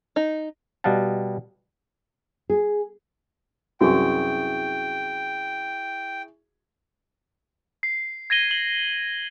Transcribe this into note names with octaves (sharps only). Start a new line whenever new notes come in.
D#4
B2 G3 D#5 F5 F#5 A5
G#4
C2 F#2 E3 E4 F#4 G#4 G5 C#6
C7
G#6 A#6 D#7 G7
F#7 G7